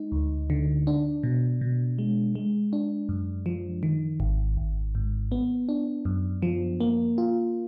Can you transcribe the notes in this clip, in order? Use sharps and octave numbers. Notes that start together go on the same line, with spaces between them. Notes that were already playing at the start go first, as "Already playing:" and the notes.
Already playing: G#3 D#4
D2
D3
D4
B2
B2
G#3
G#3
D4
F#2
F3
D#3
G#1
G#1
G#2
B3
D4
F#2
F3
A#3
F4